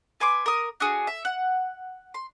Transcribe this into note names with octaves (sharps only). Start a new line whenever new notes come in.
B4 G#5 C6 D6
A#4 D#6
D4 F#4 G#4
E5
F#5
C6